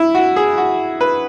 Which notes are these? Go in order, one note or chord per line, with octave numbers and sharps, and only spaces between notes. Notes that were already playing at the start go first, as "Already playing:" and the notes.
Already playing: E4
F#4
G#4
F#4
B4